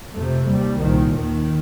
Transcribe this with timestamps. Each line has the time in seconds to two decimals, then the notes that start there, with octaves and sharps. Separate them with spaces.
0.14 F2 A3
0.20 C3
0.47 D#2 G3
0.80 C2 A#2 D#3
1.13 D#2 D#3